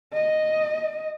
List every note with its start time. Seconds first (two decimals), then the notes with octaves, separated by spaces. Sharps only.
0.13 D#5